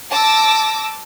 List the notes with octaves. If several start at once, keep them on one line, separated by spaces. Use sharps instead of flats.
A5 D6 E6 A#6